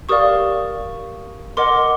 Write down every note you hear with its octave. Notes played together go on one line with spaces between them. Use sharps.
G4 A#4 D5 F5 C#6 D#6
A#4 D#5 F#5 C6 D6